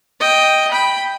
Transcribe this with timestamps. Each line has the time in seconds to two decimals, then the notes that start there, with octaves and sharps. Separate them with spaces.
0.20 D#5 G5
0.71 G5 B5